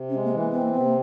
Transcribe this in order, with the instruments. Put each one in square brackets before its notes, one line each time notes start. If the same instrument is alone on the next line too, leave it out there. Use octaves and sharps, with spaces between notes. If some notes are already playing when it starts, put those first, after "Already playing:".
Already playing: [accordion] C3
[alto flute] C#4
[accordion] G#3
[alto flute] A#3
[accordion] E3 [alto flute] A#3
[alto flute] B3 [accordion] C4
[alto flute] A#3
[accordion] C3 [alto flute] B3
[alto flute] A#3